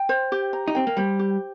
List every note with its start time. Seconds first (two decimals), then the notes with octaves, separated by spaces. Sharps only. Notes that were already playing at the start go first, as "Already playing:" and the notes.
Already playing: G5
0.09 C5
0.32 G4
0.53 A#5
0.68 D#4
0.75 C4 G5
0.87 A#3
0.97 G3 C5
1.19 G4